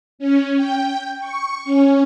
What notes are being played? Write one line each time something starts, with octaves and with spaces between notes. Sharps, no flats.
C#4
G5
C#6
C#4